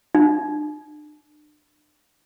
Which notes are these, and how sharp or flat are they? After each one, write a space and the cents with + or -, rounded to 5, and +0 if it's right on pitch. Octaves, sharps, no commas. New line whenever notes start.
D4 +35